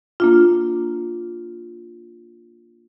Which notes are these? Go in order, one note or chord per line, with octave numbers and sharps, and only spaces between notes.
A#3 D4 F4